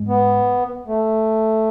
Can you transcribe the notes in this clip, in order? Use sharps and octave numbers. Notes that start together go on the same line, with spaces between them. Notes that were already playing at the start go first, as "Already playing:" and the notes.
Already playing: G#2 G#3
B3
A3